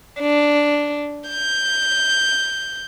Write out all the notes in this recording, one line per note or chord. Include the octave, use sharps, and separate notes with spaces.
D4
G6